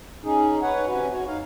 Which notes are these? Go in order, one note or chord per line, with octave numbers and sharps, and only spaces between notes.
C#4 D#4 G#4
B4 C#5 F#5
C3 C#4 F#4 B4
F#4 C#5
F2 D#4 F5